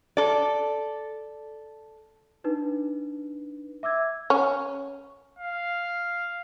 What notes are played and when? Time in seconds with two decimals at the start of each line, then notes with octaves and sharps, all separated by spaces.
0.17 A4 D5
2.44 D4 D#4 B4
3.83 E5 D6 E6 G#6
4.30 C#4
5.39 F5